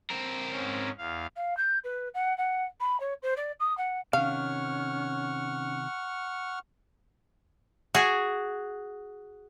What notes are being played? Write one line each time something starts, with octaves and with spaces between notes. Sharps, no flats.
C4 A#4
G#2 C#4
E2 F5
F5
G6
B4
F#5
F#5
B5
C#5
C5
D5
D#6
F#5
C3 D#3 C#4 F5 F#5 C#6 F6
F#4 G#4